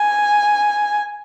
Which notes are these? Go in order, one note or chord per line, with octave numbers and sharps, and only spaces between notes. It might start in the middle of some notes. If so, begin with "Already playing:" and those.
Already playing: G#5